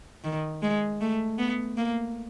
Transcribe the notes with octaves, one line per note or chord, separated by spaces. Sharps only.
D#3
G#3
A3
B3
A#3